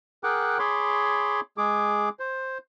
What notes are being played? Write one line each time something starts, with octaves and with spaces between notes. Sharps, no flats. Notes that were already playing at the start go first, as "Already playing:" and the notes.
G#4 A#4 F#5 G5 D6 F#6
G#4 C#5 B5 C6 D6
G#3 G#4 D6
C5